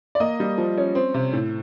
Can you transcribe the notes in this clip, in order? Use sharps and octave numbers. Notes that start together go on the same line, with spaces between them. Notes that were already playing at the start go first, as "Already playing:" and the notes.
D5
A#3 D#5
G3
F3
C#4
C4
C3
A2